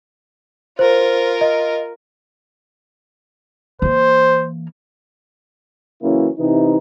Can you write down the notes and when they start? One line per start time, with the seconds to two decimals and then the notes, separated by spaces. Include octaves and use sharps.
0.79 F4 A#4 C5
1.41 D#5
3.82 E3 A#3 C5
6.03 C#3 E3 F#3 A#3 C#4 E4
6.39 C3 E3 D#4